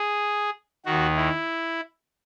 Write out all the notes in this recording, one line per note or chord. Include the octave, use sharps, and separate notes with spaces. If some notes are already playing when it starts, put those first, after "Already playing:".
Already playing: G#4
D#2 D#3 F#4
E4